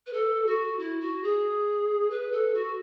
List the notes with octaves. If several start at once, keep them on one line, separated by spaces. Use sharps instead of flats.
B4
A4
F#4
E4
F#4
G#4
B4
A4
F#4